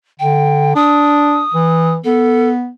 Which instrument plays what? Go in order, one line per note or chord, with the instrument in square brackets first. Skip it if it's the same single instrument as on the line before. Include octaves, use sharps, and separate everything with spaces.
[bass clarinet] D3 [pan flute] G5
[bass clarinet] D4 [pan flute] D#6
[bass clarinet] E3
[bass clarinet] B3 [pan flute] A4